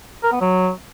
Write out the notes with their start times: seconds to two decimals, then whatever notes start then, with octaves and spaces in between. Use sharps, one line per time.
0.24 A#4
0.32 B3
0.41 F#3